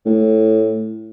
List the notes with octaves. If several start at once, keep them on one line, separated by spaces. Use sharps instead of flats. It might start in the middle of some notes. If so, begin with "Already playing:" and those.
A2